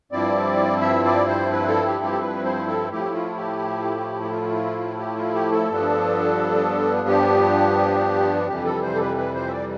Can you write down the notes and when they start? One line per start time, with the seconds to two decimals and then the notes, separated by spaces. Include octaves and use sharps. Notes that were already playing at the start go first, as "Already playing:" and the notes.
0.12 G2 F3 C4 E4 D5
0.81 E5
1.05 D5
1.28 C5
1.52 B4
1.68 A4
1.86 G4
2.04 G4
2.13 A4
2.21 B4
2.44 C5
2.67 A4
2.91 A2 F3 A3 E4 G4
3.14 F4
3.37 G4
4.23 G4
4.29 F4
4.99 G4
5.17 F4
5.34 G4
5.52 A4
5.69 G2 F3 B3 D4
7.08 G4
8.48 F2 C3 E3 G3 G4
8.65 A4
8.82 C5
8.94 A4
9.00 B4
9.17 B4
9.34 C5
9.48 E5
9.52 D5